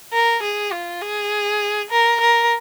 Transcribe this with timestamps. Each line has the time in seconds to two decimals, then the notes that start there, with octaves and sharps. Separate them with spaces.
0.13 A#4
0.43 G#4
0.72 F4
1.02 G#4
1.91 A#4
2.20 A#4